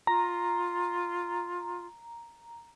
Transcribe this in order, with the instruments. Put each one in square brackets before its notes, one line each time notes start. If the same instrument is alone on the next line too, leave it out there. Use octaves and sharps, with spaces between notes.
[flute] F4 [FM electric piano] A#5